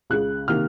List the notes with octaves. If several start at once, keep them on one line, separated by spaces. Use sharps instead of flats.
C#2 C#3 G#3 F#6
C3 D#3 A#3 F6